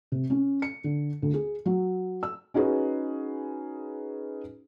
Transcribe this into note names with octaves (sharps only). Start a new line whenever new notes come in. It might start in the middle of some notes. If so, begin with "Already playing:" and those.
C3
C#4
C#7
D3
D2
G#4
F#3
E6
C#4 D#4 F#4 G#4 B4